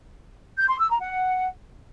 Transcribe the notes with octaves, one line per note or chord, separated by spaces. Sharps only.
G6
C6
E6
A#5
F#5